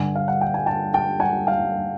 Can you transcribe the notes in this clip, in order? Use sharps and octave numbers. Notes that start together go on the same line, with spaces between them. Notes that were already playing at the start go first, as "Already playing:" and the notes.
Already playing: G2 D3 F#5 G#5
F5
F#5
G5
G#5
G5 A5
G5 A5
F#5 G#5
F5 G5